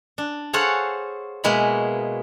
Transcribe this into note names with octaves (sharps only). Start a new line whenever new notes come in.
D4
G#4 A4 C5 C#5 F5 F#5
B2 G#3 A#3 E4 B5